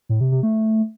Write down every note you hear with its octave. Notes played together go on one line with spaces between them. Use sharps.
A2
C3
C3
A3